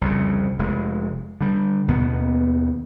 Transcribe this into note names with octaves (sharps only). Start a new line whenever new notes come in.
C2 F2 C#3
F1 G#3
D3 G3
D#2 B2 A#3 B3